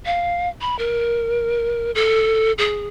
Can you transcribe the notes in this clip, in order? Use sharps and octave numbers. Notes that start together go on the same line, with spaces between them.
F5
B5
A#4
A4
G#4